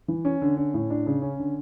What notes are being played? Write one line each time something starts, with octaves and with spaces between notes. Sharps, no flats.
E3
C#4
D3
C#4
A2
D4
C#3
C#4
D3